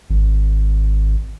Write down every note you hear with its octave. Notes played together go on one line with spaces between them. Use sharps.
G#1